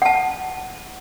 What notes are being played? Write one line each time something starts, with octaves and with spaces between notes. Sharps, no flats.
F#5 A5